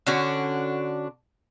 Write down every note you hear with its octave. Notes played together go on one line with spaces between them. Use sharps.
D3 C#4 D4 F#4